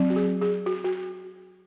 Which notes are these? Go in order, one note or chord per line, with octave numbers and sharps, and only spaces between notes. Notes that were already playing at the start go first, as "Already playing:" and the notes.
Already playing: F#3 C4
F#4
G#4
G#4
F#4
F#4